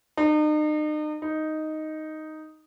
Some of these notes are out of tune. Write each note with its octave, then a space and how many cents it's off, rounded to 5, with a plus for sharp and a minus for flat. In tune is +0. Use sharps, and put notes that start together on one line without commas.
D#4 -40
D#4 +0